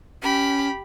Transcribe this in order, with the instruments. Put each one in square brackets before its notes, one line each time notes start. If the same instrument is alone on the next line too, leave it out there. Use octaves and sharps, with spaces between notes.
[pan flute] C#4 [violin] G4 B5